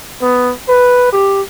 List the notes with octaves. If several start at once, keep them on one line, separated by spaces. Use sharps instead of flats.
B3
B4
G4